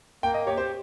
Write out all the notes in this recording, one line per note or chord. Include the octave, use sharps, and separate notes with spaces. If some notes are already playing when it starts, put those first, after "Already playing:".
A#3 G5
D#5
G4 C#5
C5